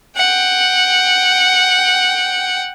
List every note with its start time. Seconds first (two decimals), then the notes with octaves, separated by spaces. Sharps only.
0.16 F#5 G5